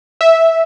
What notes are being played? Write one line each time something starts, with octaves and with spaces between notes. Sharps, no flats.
E5